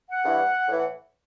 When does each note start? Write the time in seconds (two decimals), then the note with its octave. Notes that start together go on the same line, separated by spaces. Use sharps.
0.09 F#5
0.24 G2 E3
0.68 A2 E3